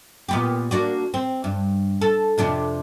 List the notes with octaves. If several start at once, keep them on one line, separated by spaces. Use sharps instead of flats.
A#2 B3 G4
A#3 D4 F#4
C4
G2
A4
F2 C3 D4